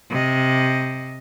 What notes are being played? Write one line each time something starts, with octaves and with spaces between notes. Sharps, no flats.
C3 D#5